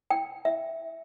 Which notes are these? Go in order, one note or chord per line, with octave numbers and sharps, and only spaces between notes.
G5
E5